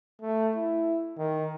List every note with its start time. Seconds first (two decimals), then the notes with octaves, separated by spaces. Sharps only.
0.21 A3
0.55 E4
1.18 D#3